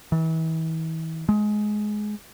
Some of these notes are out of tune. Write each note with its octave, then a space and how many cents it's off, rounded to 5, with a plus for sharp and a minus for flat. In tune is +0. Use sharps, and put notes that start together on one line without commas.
E3 -35
G#3 +15